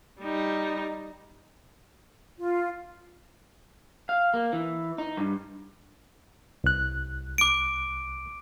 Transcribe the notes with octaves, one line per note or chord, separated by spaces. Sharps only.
G3 D#4
F4
F5
A#3
E3
D#4
G2
C2 F#6
D6 D7